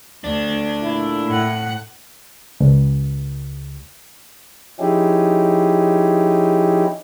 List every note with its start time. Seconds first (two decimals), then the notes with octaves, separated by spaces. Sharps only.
0.24 D2 D4
0.82 A#2 A3 E4
1.27 A2 F#5
2.60 C#2
4.79 F3 C#4 D#4 E4 G4 G#4